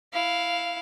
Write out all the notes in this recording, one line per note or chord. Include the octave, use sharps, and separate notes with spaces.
E4 F5